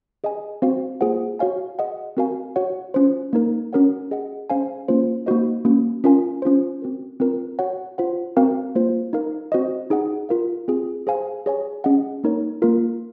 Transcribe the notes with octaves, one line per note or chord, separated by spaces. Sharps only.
G#4 D#5 G#5
C4 F#4 C5 F5
A#3 F4 G#4 C5 F#5
F#4 C#5 F5 G#5
G#4 D#5 F#5
C4 F#4 A#4 F5 G#5
F#4 C#5 F#5
C#4 F4 C5
A#3 D#4 A#4
C#4 F#4 A#4 C#5 F#5
G#4 D#5 F#5
C#4 G#4 C5 F5 G#5
A#3 C#4 F4 C5
A#3 D#4 F#4 C5 D#5
A#3 C#4 F#4
C#4 F4 A#4 F5 G#5
C#4 F4 C5
C4 F#4 A#4
C4 F4 A#4
F#4 C#5 F#5
F4 C5 F#5
C4 F#4 A#4 F5
A#3 F4 C5
D#4 A#4 F5
C4 F#4 C5 D#5
D#4 G#4 D#5 F#5
F4 A#4 F5
C4 F4 G#4
G#4 C5 F5 G#5
G#4 C#5 G#5
C#4 G#4 D#5 F#5
A#3 D#4 A#4 C#5
A#3 F4 A#4